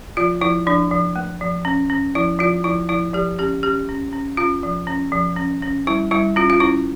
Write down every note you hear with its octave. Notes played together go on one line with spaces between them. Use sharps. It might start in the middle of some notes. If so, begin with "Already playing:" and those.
F3 F4
F3 E4
F3 D4
F3
A3
F3
C#4
C#4
F3 E4
F3 F4
F3 E4
F3 E4
F3 G4
C#4 G4
C#4 G4
C#4
C#4
C#4 F4
F3
C#4
F3
C#4
C#4
G3 E4
G3 E4
C#4 F4
F4
C#4 E4